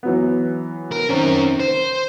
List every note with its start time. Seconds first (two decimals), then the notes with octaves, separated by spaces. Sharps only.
0.03 E3 F#3 B3
0.92 A#4
1.10 D#3 C4 C#4 A#4
1.60 C5